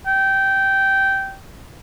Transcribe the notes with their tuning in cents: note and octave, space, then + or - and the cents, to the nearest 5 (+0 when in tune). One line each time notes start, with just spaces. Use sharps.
G5 -15